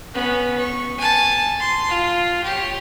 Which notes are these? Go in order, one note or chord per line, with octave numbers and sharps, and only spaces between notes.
B3 C#4
C#6
G#5 A5
C6
F4
G4 C#5